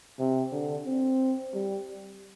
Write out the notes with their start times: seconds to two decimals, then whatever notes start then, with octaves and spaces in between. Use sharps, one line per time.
0.19 C3
0.52 D3
0.86 C4
1.54 G3